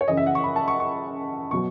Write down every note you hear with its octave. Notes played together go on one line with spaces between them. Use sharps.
C#5
F#2 C#3 E3 D#5
E5
F#5
C#6
B5
A5
C#6
C#6
B2 F#3 C#6